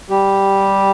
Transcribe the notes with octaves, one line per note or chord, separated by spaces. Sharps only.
G3 G4